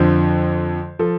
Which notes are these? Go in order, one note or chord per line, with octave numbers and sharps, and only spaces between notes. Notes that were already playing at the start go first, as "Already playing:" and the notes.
Already playing: F2 D3 F3 C5
F3 A4